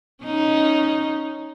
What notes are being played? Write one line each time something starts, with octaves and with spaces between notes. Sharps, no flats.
C#4 D#4